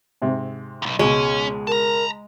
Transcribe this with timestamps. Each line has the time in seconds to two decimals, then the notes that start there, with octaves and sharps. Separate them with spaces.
0.22 G#2 C3
0.82 B1 E2
0.99 C#2 B2 G#3 C#4
1.67 A#4 A5 A#5